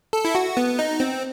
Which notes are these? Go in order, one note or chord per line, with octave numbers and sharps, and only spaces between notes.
A4
E4
F#4
B3
D#4
C4